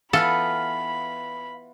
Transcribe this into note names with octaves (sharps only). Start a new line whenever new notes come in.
E3 B3 F4 A4 F5 B5